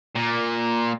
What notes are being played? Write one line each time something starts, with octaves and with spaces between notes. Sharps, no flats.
A#2